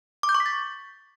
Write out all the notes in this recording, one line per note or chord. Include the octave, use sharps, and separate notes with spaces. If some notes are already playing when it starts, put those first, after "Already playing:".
D6
G6
C#6
B6
A6